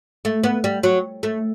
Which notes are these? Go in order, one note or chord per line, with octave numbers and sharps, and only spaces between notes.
A3
B3
G3
F#3
A3